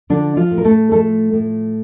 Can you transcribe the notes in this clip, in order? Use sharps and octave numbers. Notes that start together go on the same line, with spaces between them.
D3 F3 D4
F3 F4
A2
A#4
A3 A4
F3 A3 A4
A2